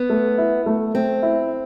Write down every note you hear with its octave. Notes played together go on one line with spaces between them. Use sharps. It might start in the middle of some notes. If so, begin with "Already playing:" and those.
Already playing: B3
A3
E4
A3
A3 C4
E4